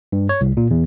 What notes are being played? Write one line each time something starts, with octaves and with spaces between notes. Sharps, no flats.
G2
C#5
C2
A#2
E2